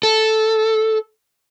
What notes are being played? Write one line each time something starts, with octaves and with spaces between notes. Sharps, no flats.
A4